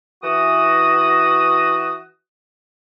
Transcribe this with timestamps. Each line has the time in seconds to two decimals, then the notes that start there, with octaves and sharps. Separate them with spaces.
0.23 E3 F#4 D#6